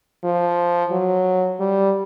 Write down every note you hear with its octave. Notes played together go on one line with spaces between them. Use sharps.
F3
F#3
G3